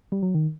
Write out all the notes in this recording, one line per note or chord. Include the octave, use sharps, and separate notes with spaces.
G3
F#3
D#3